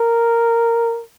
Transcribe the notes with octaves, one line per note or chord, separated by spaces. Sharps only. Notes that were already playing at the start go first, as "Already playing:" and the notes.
Already playing: A#4